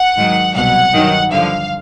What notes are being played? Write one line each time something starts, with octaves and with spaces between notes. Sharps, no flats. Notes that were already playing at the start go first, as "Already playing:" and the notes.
Already playing: F#5
G#2 D#3 F#3
C2 B2 F#3 F#5
G2 D#3 F#3
G2 D3 F3 F5